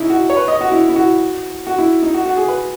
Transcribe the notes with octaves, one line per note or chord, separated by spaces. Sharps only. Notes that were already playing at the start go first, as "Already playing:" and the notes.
Already playing: C#4 D#4 E4
F#4
C#5
B4
D#5
F#4
E4
E4
F#4
F#4
E4
D#4
F#4
F#4
G#4
B4